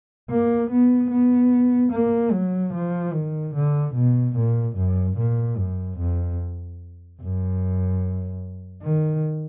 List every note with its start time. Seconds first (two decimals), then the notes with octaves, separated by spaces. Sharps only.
0.29 A#3
0.70 B3
1.10 B3
1.92 A#3
2.32 F#3
2.73 F3
3.13 D#3
3.55 D3
3.95 B2
4.36 A#2
4.76 F#2
5.18 A#2
5.58 F#2
5.98 F2
7.21 F#2
8.82 D#3